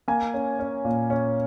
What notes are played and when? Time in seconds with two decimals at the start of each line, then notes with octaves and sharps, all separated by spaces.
0.08 A#3 G#5
0.34 C#4
0.59 C#4
0.85 A#2
1.10 C#4